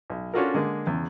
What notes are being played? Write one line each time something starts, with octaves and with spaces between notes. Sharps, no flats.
B1
C#4 D4 F4 F#4 A4 A#4
D3 G#3 A#3
E2 C#3